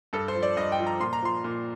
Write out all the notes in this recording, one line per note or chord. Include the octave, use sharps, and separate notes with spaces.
G2 A4
C5
F3
D5
G2 D#5
G5
F3
A#5
A#2 C6
A#5
F3 C6
A#2